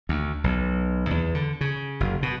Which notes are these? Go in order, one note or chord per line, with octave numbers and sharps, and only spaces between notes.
D2
B1
E2
D3
C#3
F#1
B2